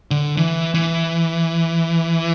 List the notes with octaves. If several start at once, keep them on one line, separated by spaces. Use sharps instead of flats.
D3
E3
E3